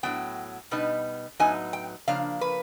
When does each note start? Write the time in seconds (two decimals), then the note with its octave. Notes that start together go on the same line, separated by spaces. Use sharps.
0.03 A2 F#3 B3 G5
0.71 B2 G3 B3 D#4
1.40 A2 F#3 B3 D#4 G#5
1.73 G5
2.08 C#3 F3 A#3 D4 F5
2.41 B4